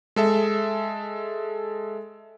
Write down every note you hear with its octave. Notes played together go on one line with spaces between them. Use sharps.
G#3 A4 E5